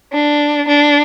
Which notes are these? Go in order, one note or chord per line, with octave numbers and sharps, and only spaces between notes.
D4
D4